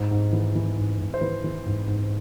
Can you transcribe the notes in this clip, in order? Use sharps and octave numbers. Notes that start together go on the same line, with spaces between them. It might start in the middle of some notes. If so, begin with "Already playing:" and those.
Already playing: G#2
G#2
E3
E3
G#2
G#2
C5
E3 B4
E3
G#2
G#2